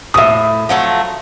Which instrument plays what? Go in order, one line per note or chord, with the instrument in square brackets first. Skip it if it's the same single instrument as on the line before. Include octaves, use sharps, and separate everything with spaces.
[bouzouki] A2 C3 [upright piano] E5 D#6
[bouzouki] F3 F#3 A3